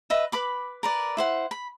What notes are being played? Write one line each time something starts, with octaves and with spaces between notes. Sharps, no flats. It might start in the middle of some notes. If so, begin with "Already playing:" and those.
B4 D#5 E5
B4 B5 D6
A#4 B4 D5
E4 C5 F#5
B5